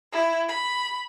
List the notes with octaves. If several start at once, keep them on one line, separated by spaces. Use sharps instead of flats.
E4
B5